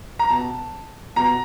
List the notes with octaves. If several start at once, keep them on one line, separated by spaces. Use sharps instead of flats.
A#5
B2 A5
B2 A#5